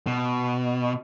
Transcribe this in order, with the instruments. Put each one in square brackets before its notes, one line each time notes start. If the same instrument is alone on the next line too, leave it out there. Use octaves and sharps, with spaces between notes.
[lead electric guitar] B2